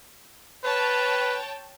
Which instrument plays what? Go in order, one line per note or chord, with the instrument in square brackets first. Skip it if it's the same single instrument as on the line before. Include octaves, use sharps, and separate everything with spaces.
[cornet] B4 [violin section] C#5 G5 A5